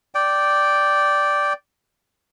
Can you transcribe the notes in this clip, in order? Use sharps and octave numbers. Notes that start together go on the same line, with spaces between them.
D5 G5